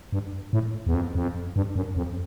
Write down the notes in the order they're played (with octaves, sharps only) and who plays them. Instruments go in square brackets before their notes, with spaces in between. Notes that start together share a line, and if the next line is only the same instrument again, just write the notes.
[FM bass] G2
A2
E2
F2
F2
G2
F#2
F2